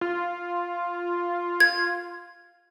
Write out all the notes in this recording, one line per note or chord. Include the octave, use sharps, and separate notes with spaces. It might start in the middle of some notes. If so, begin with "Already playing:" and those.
F4
G#6